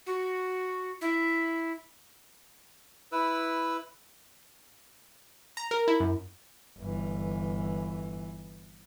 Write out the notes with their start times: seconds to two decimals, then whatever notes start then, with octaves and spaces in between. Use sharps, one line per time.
0.06 F#4
1.01 E4
3.12 E4 B4 E6
5.57 A#5
5.71 A#4
5.88 E4
6.00 F#2
6.79 G1 E3